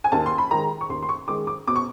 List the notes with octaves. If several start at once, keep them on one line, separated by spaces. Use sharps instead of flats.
G#5
D#2 A5
C6
B5
D#3 G#3 A#5
C#6
D#2 C6
C6
C#6
D#3 G#3 D6
D6
B2 D6
C#6